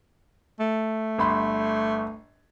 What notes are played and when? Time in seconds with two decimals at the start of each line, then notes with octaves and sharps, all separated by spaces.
0.60 A3
1.18 G1 B5 C6